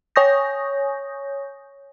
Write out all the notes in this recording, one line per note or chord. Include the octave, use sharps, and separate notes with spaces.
C#5 G#5 C#6 D#6 G6 A#6